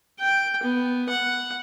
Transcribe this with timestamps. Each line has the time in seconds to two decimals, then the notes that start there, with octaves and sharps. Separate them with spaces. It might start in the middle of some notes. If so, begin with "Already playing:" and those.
0.20 G5
0.63 B3
1.09 F#5